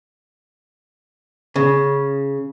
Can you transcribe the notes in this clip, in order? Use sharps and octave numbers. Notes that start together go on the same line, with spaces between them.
C#3